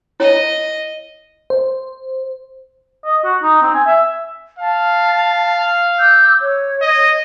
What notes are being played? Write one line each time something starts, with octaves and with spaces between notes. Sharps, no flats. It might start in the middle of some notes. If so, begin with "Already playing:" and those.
E4 C#5 D#5
C5
D#5
F#4
D#4
C4
G#5
E5
F5 A5
D6 E6 G6
C#5
D#5